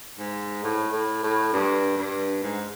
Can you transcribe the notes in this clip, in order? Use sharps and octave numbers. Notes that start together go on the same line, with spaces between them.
G#2
A2
A2
A2
G2
G2
G#2